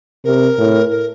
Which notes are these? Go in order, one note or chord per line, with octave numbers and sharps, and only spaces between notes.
C3 A#4
A2
A#4